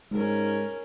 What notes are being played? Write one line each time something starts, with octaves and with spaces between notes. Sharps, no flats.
G#2 G#3 C#4 A#4